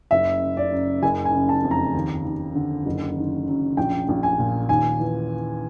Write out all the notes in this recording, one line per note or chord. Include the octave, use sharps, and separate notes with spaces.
F#1 E5
C#3
D5
F#2
F#1 G#5
G#5
C#3
A5
F2
A#5
D#2
D#2
D3
F#1
D#3
F#2
A#1 G5
A#1
G#5
A#2
D#2 G#5
E3